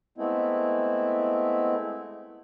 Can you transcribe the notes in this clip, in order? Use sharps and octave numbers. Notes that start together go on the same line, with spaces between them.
G#3 A3 B3 C4 E4